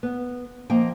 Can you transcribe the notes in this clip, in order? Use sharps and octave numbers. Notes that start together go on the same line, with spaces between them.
B3
F3 A#3 D#5 G5